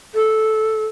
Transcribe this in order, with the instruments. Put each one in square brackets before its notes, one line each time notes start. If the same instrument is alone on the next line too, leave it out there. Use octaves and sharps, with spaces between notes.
[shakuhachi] A4